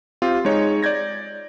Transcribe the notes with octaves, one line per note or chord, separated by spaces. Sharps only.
C4 F4 G4
G#3 D#4 C#5
D5 G6 G#6 A#6